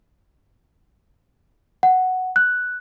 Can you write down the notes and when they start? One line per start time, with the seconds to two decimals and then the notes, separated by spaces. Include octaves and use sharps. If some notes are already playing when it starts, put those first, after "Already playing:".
1.83 F#5
2.36 F#6